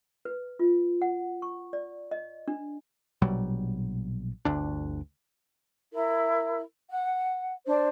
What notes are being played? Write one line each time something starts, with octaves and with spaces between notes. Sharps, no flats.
B4
F4
F#5
C#6
D5
D#5
D4
A#1 B2 F#3 G3
G1 D2 D4
E4 A#4
F#5
D4 C5